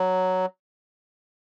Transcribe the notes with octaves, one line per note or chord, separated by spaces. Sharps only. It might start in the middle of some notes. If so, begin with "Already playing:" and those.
Already playing: F#3